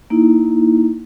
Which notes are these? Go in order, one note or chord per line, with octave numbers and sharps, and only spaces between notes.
A#3 D#4 E4